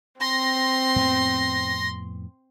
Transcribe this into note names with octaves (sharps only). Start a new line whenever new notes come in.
C4 C6 A#6
F2 A2 B3